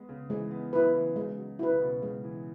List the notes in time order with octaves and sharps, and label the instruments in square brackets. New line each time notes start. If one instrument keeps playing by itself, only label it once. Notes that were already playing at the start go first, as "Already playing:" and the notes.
Already playing: [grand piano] G#3 B3
C#3
[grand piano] E3 [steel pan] G#3
[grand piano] B3
[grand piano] F#3 [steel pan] E4 B4
[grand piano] C#3
E3
[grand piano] C#3 [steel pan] G#3
[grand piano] F#3
[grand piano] F#3 [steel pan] E4 B4
[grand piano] C#3
B2
[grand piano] C#3 [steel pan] G#3
[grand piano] E3